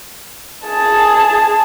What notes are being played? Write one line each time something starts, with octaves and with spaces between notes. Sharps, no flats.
G#4 A5